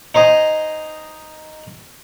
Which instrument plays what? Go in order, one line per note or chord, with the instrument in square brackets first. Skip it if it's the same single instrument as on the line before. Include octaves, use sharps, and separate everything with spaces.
[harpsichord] D#4 C5 D#5 G#5